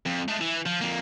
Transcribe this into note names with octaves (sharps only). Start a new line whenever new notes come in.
F2
G#3 A3
E3
F3
F2 A#3